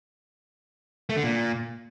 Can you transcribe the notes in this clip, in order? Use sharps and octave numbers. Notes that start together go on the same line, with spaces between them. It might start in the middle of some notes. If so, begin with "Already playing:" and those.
A3
D3
A#2